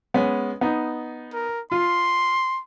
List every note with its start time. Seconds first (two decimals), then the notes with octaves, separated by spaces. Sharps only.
0.14 G#3 B3 C#4
0.61 B3 D#4
1.33 A#4
1.72 F4 C6